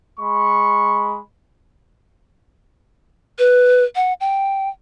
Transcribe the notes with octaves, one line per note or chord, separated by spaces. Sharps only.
G#3 B5 C#6
B4
F#5
G5